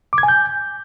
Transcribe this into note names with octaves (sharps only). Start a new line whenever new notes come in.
D6
G#6
G#5
G6